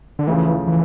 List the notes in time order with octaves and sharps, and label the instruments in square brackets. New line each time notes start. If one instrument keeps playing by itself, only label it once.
[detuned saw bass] D3
[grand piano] D2 C#3 F3 [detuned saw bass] E3
[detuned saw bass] E3